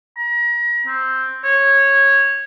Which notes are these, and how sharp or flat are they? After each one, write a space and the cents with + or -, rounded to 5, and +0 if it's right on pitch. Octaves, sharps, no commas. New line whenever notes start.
A#5 +35
C4 +0
C#5 -10